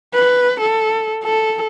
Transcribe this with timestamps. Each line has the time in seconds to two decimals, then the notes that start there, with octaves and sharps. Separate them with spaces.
0.14 B4
0.61 A4
1.24 A4